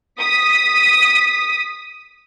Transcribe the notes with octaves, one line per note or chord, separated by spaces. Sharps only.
D#6 B6